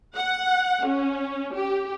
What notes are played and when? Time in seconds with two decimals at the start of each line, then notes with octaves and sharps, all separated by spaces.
0.15 F#5
0.84 C#4
1.54 G4